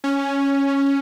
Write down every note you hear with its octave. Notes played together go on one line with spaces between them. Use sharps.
C#4